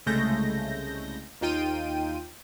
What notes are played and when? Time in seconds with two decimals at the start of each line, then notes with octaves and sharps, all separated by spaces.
0.06 C2 C#3 G#3 A3 G6 A#6
1.41 D#2 D#4 F4 G5 D#7